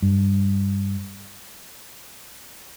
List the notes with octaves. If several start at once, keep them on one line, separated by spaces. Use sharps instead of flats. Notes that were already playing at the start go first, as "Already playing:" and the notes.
G2